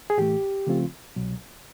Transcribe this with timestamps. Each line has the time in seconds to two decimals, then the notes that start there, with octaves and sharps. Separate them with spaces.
0.10 G#4
0.17 A2 E3 A3 G4
0.67 C#3 F3 A3 C4 F4
1.16 C2 B2 F#3